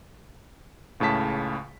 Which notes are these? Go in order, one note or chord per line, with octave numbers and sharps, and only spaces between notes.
C#2 A2 C#3 A5 B6